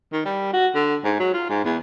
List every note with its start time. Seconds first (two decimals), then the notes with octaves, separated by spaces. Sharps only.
0.13 D#3
0.25 G3
0.53 F#4
0.75 D3
1.04 G#2
1.20 F#3
1.34 F4
1.50 G#2
1.65 E2